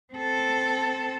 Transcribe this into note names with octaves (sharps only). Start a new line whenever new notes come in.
C4 A4